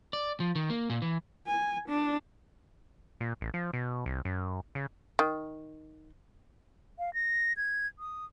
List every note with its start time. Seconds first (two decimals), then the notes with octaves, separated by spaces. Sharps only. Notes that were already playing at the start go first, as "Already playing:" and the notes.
0.13 D5
0.40 F3
0.55 D#3
0.70 A#3
0.90 A#2
1.02 E3
1.47 G#5
1.88 D4
3.20 A#2
3.41 A1
3.54 F3
3.73 B2
4.06 C2
4.25 F#2
4.75 C#3
5.19 D#3
6.99 F5
7.14 A#6
7.57 G#6
7.99 D#6